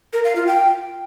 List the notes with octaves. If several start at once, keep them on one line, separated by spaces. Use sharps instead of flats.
A#4
F5
F4
G5